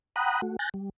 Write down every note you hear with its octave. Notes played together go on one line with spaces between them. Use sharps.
F#5 G5 A#5 B5 D#6 F#6
A3 F#4
G#5 F#6 G6 A6 A#6
G3